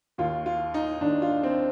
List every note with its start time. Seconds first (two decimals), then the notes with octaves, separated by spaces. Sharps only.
0.18 D#2 D#3 F4
0.46 F4
0.74 D#4
1.01 D#2 D#3 D4
1.22 F4
1.43 C4